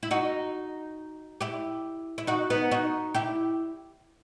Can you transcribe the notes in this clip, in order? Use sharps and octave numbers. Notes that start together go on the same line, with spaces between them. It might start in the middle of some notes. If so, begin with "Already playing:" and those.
E4
D#4 F#4
E4 G4
E4
D#4 F#4
B3 D#4
D#4 F#4
E4 G4